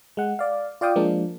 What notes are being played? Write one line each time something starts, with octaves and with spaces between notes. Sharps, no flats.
G#3 F#5
D5 F5
F4 D5 F5 G5 D#6
F3 G#3 A#3 D4